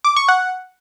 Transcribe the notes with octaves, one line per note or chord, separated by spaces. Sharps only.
D6
C#6
F#5